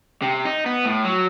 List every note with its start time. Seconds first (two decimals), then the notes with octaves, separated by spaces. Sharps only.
0.22 C3
0.45 D#4
0.66 B3
0.85 A2
1.05 F#3